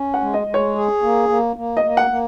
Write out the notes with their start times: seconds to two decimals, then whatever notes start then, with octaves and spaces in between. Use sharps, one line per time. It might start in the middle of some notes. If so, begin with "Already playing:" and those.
Already playing: C#4
0.14 F#5
0.21 G#3
0.34 D#5
0.47 G#3
0.54 C#5
0.75 G#4
1.02 A#3
1.29 A#3
1.56 A#3
1.77 D#5
1.84 A#3
1.97 F#5
2.10 A#3